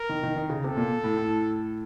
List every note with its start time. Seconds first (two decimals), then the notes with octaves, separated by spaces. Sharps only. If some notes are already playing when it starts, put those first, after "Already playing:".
Already playing: A#4
0.09 D#3
0.23 D#3
0.36 D#3
0.50 C#3
0.63 C3 A4
0.77 A#2
1.04 A2
1.17 A2